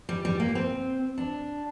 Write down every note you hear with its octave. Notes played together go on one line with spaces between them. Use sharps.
G3
G3
A#3
C4
D4